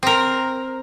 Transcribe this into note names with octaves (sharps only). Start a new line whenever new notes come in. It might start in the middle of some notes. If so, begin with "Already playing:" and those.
C4 A#4